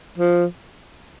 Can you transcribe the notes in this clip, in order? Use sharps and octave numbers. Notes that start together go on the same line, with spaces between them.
F3